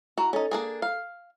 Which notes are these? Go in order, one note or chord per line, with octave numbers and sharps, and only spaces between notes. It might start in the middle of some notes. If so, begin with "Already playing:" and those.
E4 F#4 A#5
C#4 D#4 A4
A#3 D4 G#4
F5